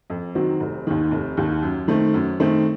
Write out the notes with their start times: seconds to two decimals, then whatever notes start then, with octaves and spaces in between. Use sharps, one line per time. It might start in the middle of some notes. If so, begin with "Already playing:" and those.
0.10 F2
0.35 D#3 F#3 C4 F#4
0.60 F1
0.87 D#2 D#3
1.11 F1
1.37 D#2 D#3
1.63 F#2
1.88 D#3 A3 C4
2.14 F#2
2.40 D#3 A3 C4